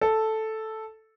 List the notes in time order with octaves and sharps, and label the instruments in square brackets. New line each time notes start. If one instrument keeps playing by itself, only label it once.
[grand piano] A4